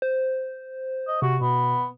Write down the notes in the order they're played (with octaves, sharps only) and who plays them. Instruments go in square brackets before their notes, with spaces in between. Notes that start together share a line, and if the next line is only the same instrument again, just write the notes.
[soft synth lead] C5
[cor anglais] D#5
[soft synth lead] C3 [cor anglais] F#4
[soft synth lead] B2 [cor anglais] B3